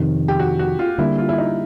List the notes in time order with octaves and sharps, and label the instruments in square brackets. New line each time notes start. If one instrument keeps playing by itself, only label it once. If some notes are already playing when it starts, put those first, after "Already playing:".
Already playing: [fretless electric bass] F2 C3 D#3
[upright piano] G4
F#4
F#4
F4
[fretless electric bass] D3 G3 A#3 [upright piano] E4
[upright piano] F4
E4
D#4